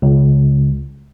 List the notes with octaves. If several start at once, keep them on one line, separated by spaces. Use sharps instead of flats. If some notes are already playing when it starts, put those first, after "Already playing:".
C#2